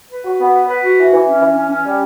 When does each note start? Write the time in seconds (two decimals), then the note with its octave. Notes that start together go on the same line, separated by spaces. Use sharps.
0.10 B4
0.25 F#4
0.39 B3
0.54 B4
0.69 B4
0.83 F#4
0.97 E3
1.12 E3
1.27 C#4
1.41 E3
1.56 C#4
1.71 C#4
1.85 G3